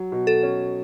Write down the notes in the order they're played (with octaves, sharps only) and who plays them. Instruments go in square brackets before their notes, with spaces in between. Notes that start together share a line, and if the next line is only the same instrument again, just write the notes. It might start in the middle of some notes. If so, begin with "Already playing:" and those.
Already playing: [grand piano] F#3
B2
[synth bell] A4
[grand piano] C#4